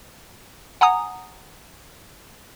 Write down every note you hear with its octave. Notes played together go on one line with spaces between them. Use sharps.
F#5 G#5 A#5 D#6